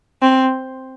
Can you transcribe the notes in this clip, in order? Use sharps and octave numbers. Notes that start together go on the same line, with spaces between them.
C4